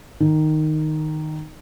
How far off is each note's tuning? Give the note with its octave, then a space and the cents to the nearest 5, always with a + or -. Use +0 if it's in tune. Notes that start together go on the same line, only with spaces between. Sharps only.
D#3 -5